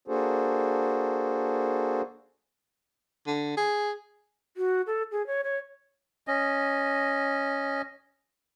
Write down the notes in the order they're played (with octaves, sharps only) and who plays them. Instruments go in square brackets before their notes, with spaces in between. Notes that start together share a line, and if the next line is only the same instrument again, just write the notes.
[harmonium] A#3 D4 F#4 G#4 A4 C5
[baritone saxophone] D3
G#4
[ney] F#4
A4
G#4
C#5
C#5
[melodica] C#4 D#5